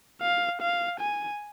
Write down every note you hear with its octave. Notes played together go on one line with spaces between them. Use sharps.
F5
F5
G#5